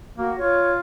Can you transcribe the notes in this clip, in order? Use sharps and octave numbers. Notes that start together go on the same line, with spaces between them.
A#3 F#4
F4 C#5